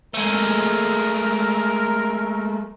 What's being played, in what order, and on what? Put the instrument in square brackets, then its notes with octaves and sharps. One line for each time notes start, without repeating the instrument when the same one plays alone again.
[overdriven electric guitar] G#3 A3 [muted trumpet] A#4